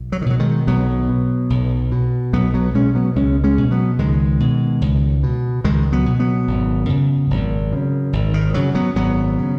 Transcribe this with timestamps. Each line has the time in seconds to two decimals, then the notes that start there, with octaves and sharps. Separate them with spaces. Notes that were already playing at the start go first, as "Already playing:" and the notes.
Already playing: B1
0.12 F#3
0.22 D#3
0.26 B2 F#3
0.40 D#3 G#3
0.67 B1 F#3 B3
1.09 B2
1.50 B1
1.92 B2
2.33 B1 F#3 B3
2.54 F#3 B3
2.75 B2 G#3 C#4
2.95 F#3 B3
3.16 C#2 G#3 C#4
3.44 G#3 C#4
3.58 B2
3.71 F#3 B3
3.99 C#2 D#3 G#3
4.40 B2
4.82 C#2
5.23 B2
5.64 C#2 D#3 G#3
5.92 F#3 B3
6.06 B2
6.20 F#3 B3
6.47 G#1
6.88 F#2 C#3
7.30 G#1
7.72 F#2 C#3
8.13 G#1
8.34 D#3
8.54 F#2 C#3 F#3
8.75 F#3 B3
8.95 G#1 F#3 B3
9.38 C#3